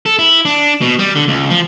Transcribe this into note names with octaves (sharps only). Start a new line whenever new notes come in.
A4
E4
D4
B2
G3
D3
C#2
F3